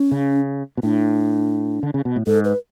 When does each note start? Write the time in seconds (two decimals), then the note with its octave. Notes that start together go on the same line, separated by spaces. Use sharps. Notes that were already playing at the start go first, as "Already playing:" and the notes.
Already playing: C#4
0.12 C#3
0.77 B2
0.83 A2 D4
1.83 D3
1.94 C#3
2.05 B2
2.16 A2
2.27 G#2 A4
2.45 B4